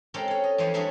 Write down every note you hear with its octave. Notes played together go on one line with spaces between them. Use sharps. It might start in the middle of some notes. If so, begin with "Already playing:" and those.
G#3 C4 C#4 G4 A4 A#4
A4 C#5
D#5
F2 E3 F3 C5 C#5
F#3 G3 A3 D4 G#4 C#5